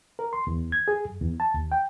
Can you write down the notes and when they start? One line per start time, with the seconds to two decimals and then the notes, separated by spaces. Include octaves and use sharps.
0.19 A#4
0.33 C6
0.47 E2
0.72 G#6
0.88 G#4
1.05 F#2
1.21 E2
1.40 A5
1.54 D#2
1.72 G5